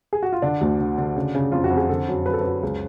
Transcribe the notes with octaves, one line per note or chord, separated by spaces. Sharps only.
G#4
F#4
F4
D3 D4
D2
D3
D3
C#3
C#3
F2 F4
F#4
F2
G#4
D3 A4
F#2
F#2 B4
A4
F#2 B4
C#2